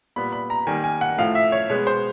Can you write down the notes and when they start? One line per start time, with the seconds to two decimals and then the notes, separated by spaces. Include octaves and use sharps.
0.16 A#2 G3 B3 B5
0.32 B5
0.50 A#5
0.67 D#3 G3 A#3 G#5
0.84 G#5
1.01 F#5
1.18 A2 F3 A3 F5
1.35 E5
1.52 C#5
1.69 B2 G#3 B3 C#5
1.87 C5